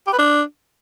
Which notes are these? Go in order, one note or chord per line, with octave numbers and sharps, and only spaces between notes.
G4
B4
D4